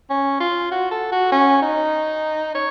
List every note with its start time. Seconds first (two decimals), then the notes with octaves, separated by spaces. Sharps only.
0.10 C#4
0.40 F4
0.71 F#4
0.91 A4
1.12 F#4
1.32 C#4
1.62 D#4
2.55 C#5